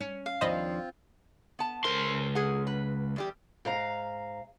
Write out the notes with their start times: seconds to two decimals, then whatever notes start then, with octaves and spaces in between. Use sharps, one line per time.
0.01 C#4
0.26 F5
0.41 D#2 F3 C4 D4 F4 C5 D#5 B5
1.59 B3 A5
1.84 C#2 A#4 C5 C6
2.35 G#4 F#5
2.67 B4
3.16 E2 G3 G4
3.65 G#2 F5 A#5